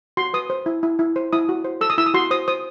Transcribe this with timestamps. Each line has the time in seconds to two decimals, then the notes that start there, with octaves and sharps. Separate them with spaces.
0.17 F#4 C6
0.34 B4 D#6
0.50 C5
0.66 E4
0.83 E4
0.99 E4
1.16 C5
1.33 E4 D#6
1.49 F#4
1.64 C5
1.81 A4 E6
1.90 D#6
1.98 E4 E6
2.06 D#6
2.14 F#4 C6
2.31 C5 D#6
2.48 C5 D#6